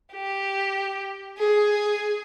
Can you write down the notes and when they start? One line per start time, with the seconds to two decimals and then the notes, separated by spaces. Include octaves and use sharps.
0.13 G4
1.38 G#4